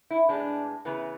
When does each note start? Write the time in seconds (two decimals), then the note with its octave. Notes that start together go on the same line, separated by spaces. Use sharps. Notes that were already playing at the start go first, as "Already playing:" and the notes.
0.11 E4
0.29 A2 G#3 B3 D4
0.85 C#3 E3 B3